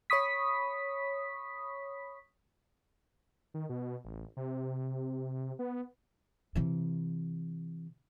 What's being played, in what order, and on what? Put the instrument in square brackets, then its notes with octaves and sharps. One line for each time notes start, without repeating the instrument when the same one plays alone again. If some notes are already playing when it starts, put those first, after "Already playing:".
[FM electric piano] C#5 B5 C#6 D#6 B6
[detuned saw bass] D#3
B2
A1
C3
B3
[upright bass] C3 E3